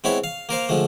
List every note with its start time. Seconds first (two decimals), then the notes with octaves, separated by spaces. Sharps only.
0.04 G#3 B3 C4 E4 C#5 E5
0.24 F5
0.49 A#3 A#4 C5 F5
0.69 D3 F3 G#3 A3